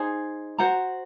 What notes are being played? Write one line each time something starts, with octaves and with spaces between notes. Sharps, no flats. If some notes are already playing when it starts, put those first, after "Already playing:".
Already playing: D#4 G#4 C5
F#4 C5 F#5 A#5